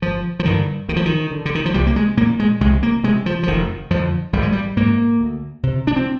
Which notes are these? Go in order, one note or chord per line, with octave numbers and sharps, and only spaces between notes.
G1 F3
F3
G2 D3 D#3
D2 D#3
F3
D#3
D3
D3
D#3
F3
C2 G3
A#3
G#3
A#2 A#3
G#3
C2 G#3
A#3
C3 G#3
F3
F3
F1 D#3
F2 D3 F3
G#1 G3
G#3
G3
G#2 A#3
D2
C3
D4
C4